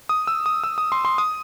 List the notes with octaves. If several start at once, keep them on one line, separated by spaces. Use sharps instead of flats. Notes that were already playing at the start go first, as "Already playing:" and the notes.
D#6
E6
D#6
E6
D#6
C6
C6
D#6